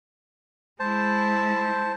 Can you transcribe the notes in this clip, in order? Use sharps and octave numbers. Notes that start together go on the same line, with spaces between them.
G#3 E4 C5 A5